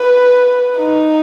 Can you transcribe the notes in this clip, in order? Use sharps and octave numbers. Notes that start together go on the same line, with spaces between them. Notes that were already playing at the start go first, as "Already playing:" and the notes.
Already playing: B4
D#4